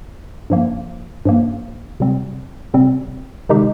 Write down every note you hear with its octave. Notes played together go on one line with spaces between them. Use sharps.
G2 F3 A#3
G2 F3 A#3
C3 G3 C4
C3 G3 C4
C3 D#3 G#3 D#4 G4